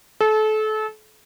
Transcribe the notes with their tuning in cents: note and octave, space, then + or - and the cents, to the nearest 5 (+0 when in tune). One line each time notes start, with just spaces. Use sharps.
A4 -30